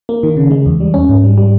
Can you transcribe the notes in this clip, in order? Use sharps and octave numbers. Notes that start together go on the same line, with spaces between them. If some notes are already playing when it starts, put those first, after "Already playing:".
A#3
D#3
C#3
G#3
E2
G3
C#4
G#2
G3
G3